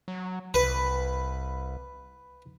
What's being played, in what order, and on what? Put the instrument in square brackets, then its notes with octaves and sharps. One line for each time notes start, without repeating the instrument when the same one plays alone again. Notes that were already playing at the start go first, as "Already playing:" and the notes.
[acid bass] F#3
[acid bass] C2 [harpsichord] B4